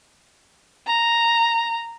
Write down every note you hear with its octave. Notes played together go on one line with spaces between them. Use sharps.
A#5